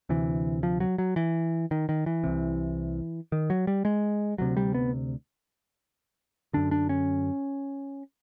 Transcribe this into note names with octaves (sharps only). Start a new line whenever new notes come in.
D2 C3 E3
F3
F#3
F#3
E3
D#3
D#3
E3
C2 C3
D#3
F#3
G3
G#3
D2 C3 F#3
G3
B3
F#2 D3 D4
D4
C#4